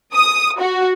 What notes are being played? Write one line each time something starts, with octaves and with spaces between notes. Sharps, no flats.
D#6
F#4